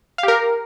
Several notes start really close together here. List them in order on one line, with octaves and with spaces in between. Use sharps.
F5 G4 A#4